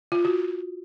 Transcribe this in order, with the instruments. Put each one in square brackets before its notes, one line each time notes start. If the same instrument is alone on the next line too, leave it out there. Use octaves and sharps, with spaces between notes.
[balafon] F4
F#4